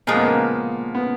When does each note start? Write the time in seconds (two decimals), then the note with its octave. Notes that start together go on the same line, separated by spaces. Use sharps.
0.07 A#2 F3 G#3 A#3
0.16 B3
0.23 A#3
0.95 B3